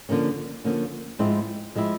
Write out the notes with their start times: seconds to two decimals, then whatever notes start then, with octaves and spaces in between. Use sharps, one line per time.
0.09 D3 F3 A#3 C#4
0.64 D3 F3 A#3 C#4
1.19 G#2 F3 G#3 C4 E4
1.75 F3 G#3 C4 E4